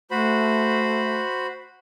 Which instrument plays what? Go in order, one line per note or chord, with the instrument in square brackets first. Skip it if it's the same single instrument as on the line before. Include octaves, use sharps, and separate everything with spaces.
[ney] A3 [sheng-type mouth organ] F#4 C5 B5